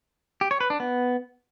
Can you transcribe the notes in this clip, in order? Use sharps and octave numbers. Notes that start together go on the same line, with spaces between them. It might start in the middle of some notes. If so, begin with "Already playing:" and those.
G4
C#5
B4
D4
B3